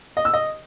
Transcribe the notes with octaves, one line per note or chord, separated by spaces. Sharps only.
D#5
E6
D#5